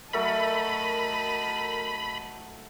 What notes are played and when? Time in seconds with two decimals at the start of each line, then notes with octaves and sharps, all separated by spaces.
0.13 F#3 A3 A4 A#4 D#5 A5 B5